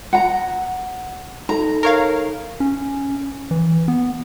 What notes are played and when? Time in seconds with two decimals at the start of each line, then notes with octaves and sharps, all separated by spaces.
0.13 F#5 A#5
1.49 D#4 A4 A#5
1.83 A#4 C#5 F5
2.60 C#4
3.51 E3
3.88 B3